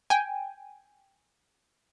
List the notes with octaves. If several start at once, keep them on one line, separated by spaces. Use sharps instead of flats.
G5 G#5